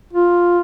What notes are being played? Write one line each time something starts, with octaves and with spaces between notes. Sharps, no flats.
F4